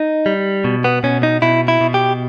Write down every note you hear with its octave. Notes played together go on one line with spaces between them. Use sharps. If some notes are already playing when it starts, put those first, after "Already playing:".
Already playing: D#4
G3
B2
B3
B2 C#4
D#4
B2 E4
E4
B2
G4